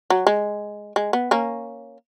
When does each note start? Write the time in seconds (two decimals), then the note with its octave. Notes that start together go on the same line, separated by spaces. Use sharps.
0.10 F#3
0.27 G#3
0.96 G#3
1.13 B3
1.31 A#3 C#4